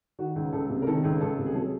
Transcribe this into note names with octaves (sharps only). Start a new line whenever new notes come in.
D#3 F#4
C#2
C#2 A4
C3
A#4
D#3 A4
C#2
C#2 A4
C3
G#4
F#3 A4